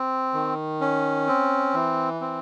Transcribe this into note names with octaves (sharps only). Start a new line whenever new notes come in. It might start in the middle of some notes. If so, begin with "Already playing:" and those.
Already playing: C4
D#3
C#4
C4
E3
C4